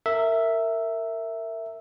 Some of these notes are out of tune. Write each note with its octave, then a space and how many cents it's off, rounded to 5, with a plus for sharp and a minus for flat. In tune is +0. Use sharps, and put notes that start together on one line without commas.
A#4 -25 E5 +0